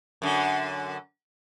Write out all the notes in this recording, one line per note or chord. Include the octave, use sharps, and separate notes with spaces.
F#2 D3